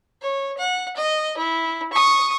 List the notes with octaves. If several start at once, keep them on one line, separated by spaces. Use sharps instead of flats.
C#5
F#5
D#5
E4
C#6 D#6